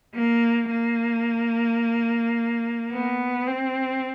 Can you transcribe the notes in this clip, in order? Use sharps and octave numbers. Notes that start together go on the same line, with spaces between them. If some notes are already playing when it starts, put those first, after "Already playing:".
A#3
A#3
B3
C4